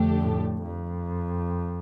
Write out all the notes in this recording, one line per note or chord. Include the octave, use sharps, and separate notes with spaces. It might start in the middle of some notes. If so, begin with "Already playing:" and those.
Already playing: F2 D3 A3 D4 G4
A2
F2